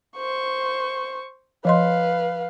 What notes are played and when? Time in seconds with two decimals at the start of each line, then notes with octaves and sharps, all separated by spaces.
0.17 C5 C#6
1.65 F3 B4 D#5 F5 C6